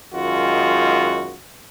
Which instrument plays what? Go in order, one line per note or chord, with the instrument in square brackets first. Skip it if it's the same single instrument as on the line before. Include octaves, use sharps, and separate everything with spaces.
[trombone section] F#2 D#3 G#3 F4 F#4